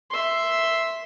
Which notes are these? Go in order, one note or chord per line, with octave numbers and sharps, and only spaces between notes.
E5 C6